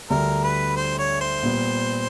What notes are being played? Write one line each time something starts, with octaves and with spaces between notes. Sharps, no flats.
D2 D3 G3 A#4
B4
C5
C#5
C5
A#2 G3 B3